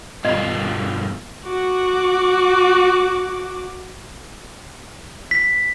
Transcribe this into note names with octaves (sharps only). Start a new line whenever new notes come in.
G2 B2 F4 D#5 B5
F#4 D6
B6